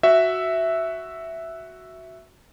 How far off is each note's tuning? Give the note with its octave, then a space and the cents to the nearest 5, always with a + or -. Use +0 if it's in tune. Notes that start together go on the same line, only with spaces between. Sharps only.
F#4 +0 E5 +0